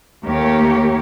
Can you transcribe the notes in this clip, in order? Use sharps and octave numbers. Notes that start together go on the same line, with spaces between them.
D#2 A3 G4 A#4 C#5